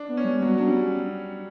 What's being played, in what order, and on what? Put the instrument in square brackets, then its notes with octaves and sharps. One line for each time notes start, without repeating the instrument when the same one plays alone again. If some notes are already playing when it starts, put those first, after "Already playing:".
Already playing: [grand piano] D4
[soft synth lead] B3
[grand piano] C#4
[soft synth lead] G3
[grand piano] F#3 [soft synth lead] B3
[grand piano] F#3 [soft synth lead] D4
[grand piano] G3 [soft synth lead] C#4